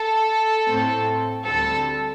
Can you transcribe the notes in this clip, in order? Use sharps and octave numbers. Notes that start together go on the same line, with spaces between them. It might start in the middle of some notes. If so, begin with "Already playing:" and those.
Already playing: A4
A2 A3 C4
D2 D3 G3 C4 A4